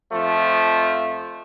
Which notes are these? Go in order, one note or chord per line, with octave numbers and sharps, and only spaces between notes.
F2 F3 A3